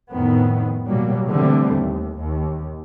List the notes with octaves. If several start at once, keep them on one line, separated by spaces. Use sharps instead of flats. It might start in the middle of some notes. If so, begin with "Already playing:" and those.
F2 A2 D#3 B3
B2 F#3 G3 A#3
D3 E3 G3 A3 C4
D#2
D#2